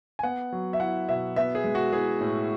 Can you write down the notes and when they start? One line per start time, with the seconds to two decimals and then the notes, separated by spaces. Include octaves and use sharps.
0.19 G#5
0.23 B3 F#5
0.52 F#3
0.73 E5
0.80 E4 F#5
1.09 B2 E5
1.36 B3 E5
1.55 G#4
1.64 G#3
1.75 F#4
1.92 E4 G#4
2.21 A2